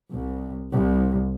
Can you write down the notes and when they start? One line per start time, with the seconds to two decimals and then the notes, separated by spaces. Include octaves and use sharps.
0.12 C2
0.71 C2